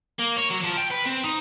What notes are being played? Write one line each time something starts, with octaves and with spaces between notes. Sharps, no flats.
A#3
C#5
F#3
F3
G5
B4
C4
D#4